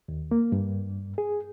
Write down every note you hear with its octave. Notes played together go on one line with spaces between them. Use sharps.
D#2
A#3
G2
G#4